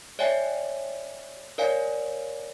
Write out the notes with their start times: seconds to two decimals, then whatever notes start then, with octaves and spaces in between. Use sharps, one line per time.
0.19 C#5 D5 E5 G5 G#5
1.58 A#4 C#5 D5 F5 G#5